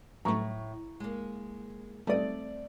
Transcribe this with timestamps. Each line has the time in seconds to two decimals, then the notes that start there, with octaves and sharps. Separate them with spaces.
0.25 A2 F#3 A3 A#5 C#6
1.00 G#3 A#3
2.07 G3 A3 C4 D5 D#6